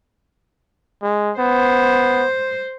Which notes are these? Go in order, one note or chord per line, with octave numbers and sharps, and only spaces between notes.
G#3
B3 C5